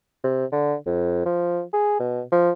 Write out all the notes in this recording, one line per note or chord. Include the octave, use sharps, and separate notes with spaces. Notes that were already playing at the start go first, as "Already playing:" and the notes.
C3
D3
F2
F3
G#4
B2
F3